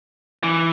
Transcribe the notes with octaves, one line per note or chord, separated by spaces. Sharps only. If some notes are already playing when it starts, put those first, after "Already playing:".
E3